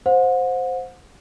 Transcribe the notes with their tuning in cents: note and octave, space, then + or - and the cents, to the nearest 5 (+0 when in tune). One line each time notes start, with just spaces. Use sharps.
C5 +0 F#5 -35